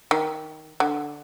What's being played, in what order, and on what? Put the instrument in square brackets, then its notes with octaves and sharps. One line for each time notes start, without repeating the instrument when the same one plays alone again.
[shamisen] D#3
D3